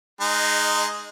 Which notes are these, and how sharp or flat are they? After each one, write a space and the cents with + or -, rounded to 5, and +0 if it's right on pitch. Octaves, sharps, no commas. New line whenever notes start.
G#3 +0 D#4 -20